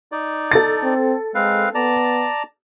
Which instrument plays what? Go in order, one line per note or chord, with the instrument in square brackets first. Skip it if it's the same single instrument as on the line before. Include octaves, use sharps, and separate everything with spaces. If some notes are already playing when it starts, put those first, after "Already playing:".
[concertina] D#4 D5
[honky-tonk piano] A4 A6
[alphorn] C4
[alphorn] G#3 [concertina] C4 B4 F5
[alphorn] B3 [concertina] D5 A5 A#5